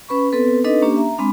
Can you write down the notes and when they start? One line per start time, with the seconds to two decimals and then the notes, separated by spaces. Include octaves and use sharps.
0.09 C#4 B4 B5 C#6
0.32 B3 C4 A4 B4
0.64 C4 D4 D#4 A4 B4 D#5
0.82 A#3 C#4 D4 G4
0.96 E5 A#5
1.18 G#3 C4 D4 B5